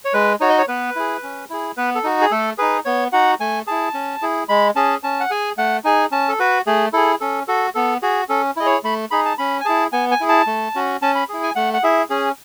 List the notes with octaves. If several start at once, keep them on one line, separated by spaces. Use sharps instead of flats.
C#5
G#3 B4
D#4 F#4 C#5
D#5
C#5
B3 B4
E4 G#4
C#4
E4 G#4
B3 B4
A4
D#4 F#4
G#4
A3 A4
D#4 G#4 B4
B3 C#5
D#4 F#4 F#5
A3 G#5
E4 G#4 A5
C#4
E4 G#4
G#3 B5
C#4 G#4 A5
C#4 A5
F#5
G#4 G#5
A3 F#5
D#4 G#4 G#5
C#4 A5
A4
F#4 B4
A3 G#4
E4 G#4 A4
C#4 A4
F#4 A4
B3 A4
F#4 G#4
C#4 A4
E4 G#4 D#5
C#5
A3 B5
D#4 G#4 B5
A5
C#4 B5
G#5
E4 G#4 A5
B3 G#5
G#5
E4 G#4
A5
A3
C#4 F#4
C#4 A5
B5
E4 G#4
G#5
A3 F#5
F#5
E4 G#4 E5
C#4 G#4